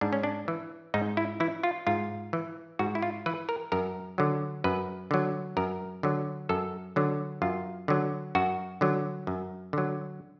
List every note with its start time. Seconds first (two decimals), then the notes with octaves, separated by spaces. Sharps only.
0.01 G#2 D4
0.13 C#4
0.23 D4
0.48 E3
0.94 G#2 D#4
1.17 E4
1.40 E3 E4
1.63 F4
1.87 G#2 F4
2.33 E3
2.79 G#2 F#4
2.95 E4
3.02 F4
3.26 E3 B4
3.49 A#4
3.72 F#2 A#4
4.18 D3 F#3
4.64 F#2 B4
5.11 D3 F#3
5.57 F#2 A#4
6.03 D3 F#3
6.49 F#2 A4
6.96 D3 F#3
7.42 F#2 F4
7.88 D3 F#3
8.35 F#2 F#4
8.81 D3 F#3
9.27 F#2
9.73 D3 F#3